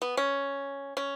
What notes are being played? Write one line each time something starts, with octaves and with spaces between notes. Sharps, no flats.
B3
C#4
C#4